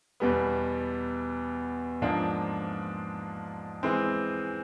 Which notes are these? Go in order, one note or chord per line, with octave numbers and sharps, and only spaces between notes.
E2 B2 G3 B3
G#2 F3 A#3 D4 F4
E3 G#3 C4